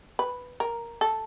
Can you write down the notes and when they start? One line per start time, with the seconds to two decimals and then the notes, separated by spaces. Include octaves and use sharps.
0.19 B4
0.60 A#4
1.01 A4